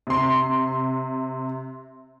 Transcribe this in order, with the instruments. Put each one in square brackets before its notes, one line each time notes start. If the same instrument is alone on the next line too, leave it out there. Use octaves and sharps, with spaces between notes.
[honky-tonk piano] C3 C6